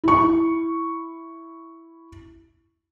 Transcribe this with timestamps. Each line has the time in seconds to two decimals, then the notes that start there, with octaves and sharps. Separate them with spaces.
0.04 E4 C#6